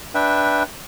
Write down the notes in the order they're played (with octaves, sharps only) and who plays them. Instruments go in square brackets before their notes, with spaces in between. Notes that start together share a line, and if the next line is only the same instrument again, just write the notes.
[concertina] D4 B4 E5 G5